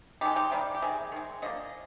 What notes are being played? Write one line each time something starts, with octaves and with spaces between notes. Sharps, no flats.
D#3 G#3 D#4 G4
D#4 G4
C3 D#3 G3 A#3
G4
C3 D#3 G#4
D#3 G#3
D3 F3 A#3 D#5